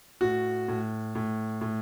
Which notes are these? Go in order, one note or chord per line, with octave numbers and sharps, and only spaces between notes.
A2 F#4
A2
A2
A2